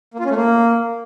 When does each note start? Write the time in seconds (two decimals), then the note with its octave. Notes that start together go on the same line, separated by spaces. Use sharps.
0.14 A#3
0.19 F4
0.25 C#4
0.30 A3
0.36 A#3